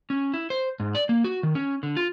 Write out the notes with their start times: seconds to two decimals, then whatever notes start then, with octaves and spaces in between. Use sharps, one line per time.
0.10 C#4
0.34 E4
0.50 C5
0.80 G#2
0.95 D5
1.09 A#3
1.24 F#4
1.43 D#3
1.55 C#4
1.83 D3
1.97 F4